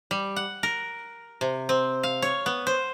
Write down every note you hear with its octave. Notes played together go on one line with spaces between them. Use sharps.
G3
F#5
A#4
C3
C4
F5
C#5
B3
C5